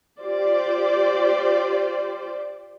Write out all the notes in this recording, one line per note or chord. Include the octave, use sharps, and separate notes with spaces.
F4 G4 C5 D5